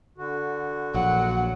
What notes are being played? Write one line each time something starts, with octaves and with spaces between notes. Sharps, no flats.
D3 F#4
A#1 F#3 F#5